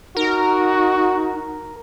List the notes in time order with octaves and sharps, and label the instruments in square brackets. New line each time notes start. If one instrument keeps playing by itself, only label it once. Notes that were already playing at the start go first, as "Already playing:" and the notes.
[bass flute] D#4 [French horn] F#4 [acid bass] A#4